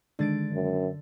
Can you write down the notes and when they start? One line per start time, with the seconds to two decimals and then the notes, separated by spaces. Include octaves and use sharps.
0.19 D3 D#3 G#3 D4 A6 D7
0.53 F#2